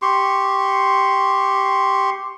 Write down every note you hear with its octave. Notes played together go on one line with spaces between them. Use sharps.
G4 C6 C#6